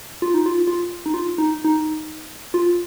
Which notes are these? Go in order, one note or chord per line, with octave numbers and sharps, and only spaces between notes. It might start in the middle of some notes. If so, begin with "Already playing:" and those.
F4
D#4
F4
F4
D#4
F4
D#4
D#4
F4